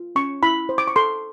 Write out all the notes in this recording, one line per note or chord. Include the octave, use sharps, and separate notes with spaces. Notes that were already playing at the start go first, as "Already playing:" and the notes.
Already playing: F4
C#4 C#6
E4 B5
C5
D6
C#6
A4 C6